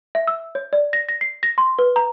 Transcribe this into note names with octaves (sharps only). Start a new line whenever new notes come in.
E5
E6
C#5
D5
A#6
A#6
C7
A#6
C6
B4
A#5